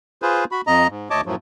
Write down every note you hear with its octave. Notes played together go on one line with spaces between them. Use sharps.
F4 G#4 B4 C5
F#4 B5
F2 D#5 A#5
G#2
D2 C#5 D#5 A5 D6
F#2 A2 F3 F#3